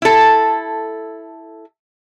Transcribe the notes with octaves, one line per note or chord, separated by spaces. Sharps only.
E4 A4